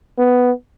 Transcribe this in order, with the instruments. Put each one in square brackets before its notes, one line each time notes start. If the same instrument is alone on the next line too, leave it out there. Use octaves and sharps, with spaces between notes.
[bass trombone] B3